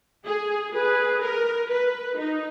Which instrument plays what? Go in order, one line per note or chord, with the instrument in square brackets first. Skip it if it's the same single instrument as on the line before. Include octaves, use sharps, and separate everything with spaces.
[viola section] G#4
[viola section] G#4 [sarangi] B4
[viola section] A#4
B4
D#4